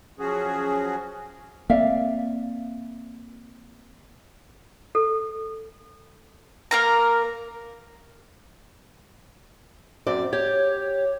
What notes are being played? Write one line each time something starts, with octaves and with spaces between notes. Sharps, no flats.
F3 F#3 C#4 F#4 G#4
A#3 C4 D5 E5 F5
A4
A#3 A#4 A#5
F#2 C4 D5
G4 C#5